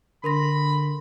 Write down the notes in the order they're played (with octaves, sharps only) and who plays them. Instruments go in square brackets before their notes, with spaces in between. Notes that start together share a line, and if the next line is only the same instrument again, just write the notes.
[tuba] D3 [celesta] A#4 C6 A#6 [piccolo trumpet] B5